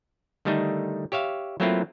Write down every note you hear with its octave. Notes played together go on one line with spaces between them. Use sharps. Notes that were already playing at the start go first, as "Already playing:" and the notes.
D3 D#3 G3 A3 D4 D#4
G4 C#5 E5 F5
F#3 A3 A#3 C4 E4 F4